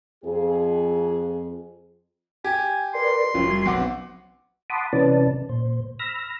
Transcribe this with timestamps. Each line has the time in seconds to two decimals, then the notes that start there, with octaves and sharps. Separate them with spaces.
0.24 F2 G#4
2.44 G4 G#5
2.94 A#4 B4 D5 C6
3.34 F#1 F3 C#4 F4
3.50 G3 G#6
3.66 B1 B3 C4 F#5 D6
4.70 F#5 A5 B5 C6 D6 D#6
4.93 C3 E3 C#4 B4 D5 A5
5.49 A#2 C5
5.99 B5 E6 F6 A#6